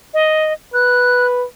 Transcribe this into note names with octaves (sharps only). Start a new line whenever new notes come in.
D#5
B4 F#6